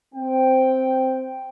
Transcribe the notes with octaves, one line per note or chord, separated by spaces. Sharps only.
C4 G5